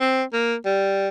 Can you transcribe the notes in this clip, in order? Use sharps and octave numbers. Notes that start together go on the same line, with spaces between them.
C4
A#3
G3